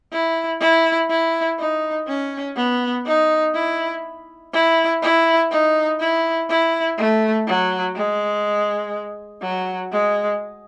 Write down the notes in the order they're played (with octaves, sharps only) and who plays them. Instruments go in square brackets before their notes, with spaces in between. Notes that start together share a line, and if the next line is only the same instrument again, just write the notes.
[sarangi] E4
E4
E4
D#4
C#4
B3
D#4
E4
E4
E4
D#4
E4
E4
A3
F#3
G#3
F#3
G#3